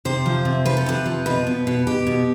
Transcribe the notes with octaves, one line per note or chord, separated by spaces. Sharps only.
C3 C5
F3
C3
F3 B4
A4
C3 B4
F3
B2 B4
B2
B2
B2 G4
B2